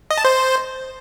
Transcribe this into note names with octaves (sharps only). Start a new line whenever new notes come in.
D#5
A5
C5